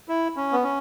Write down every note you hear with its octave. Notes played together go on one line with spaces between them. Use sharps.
E4
C#4
B3
C#4